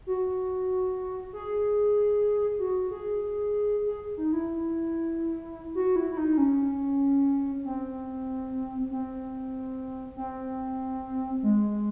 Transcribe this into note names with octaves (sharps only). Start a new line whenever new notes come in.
F#4
G#4
F#4
G#4
G#4
D#4
E4
F#4
E4
E4
D#4
C#4
C4
C4
C4
G#3